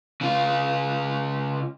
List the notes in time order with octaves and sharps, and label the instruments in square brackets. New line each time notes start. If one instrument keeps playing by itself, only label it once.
[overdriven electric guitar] C#3 F4